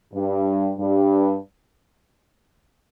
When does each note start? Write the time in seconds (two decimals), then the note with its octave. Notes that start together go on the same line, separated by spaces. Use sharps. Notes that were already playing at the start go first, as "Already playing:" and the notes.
0.13 G2
0.78 G2